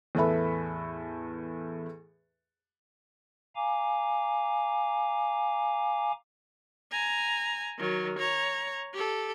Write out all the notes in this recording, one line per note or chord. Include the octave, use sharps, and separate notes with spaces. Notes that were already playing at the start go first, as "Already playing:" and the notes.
E2 A2 A4 B4 E5 B5
F5 G#5 A#5 D6
G#5 A#5
D#3 F#3
C#5 A#5
G4 A4